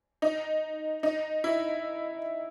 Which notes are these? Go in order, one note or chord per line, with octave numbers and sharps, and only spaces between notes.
D#4
D#4
E4